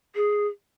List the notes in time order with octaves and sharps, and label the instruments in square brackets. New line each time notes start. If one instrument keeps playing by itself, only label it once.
[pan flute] G#4